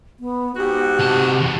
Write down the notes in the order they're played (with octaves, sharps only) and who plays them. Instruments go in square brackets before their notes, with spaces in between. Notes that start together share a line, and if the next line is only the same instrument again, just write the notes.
[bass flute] B3
[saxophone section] G#2 F#4 [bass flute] G4
[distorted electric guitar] C3 A5
E2 B2